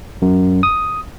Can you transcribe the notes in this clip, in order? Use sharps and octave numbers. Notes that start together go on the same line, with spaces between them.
F#2
D#6